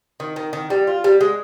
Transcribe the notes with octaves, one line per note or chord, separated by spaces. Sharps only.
D#3
D#3
D#3
G3
F4
G3
G#3